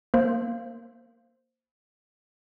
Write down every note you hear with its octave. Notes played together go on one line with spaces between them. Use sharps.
A#3 C5